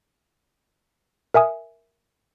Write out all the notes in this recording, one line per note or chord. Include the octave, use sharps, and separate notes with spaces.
A#4 E5 G#5 D#6